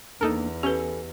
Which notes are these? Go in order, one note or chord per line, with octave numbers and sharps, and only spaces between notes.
E2 A#3 D4 D#4 A4 A#4
C#4 G4 A4 B4 G#5